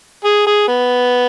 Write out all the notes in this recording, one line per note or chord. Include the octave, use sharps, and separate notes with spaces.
G#4
G#4
B3